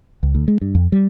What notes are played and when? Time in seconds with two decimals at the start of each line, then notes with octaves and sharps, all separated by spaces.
0.23 C#2
0.35 D2
0.48 G#3
0.61 G2
0.75 F2
0.92 G3